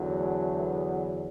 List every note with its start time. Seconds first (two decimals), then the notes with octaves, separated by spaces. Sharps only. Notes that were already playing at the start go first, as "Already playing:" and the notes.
Already playing: E2 D3 F#3
0.17 A3
0.61 B3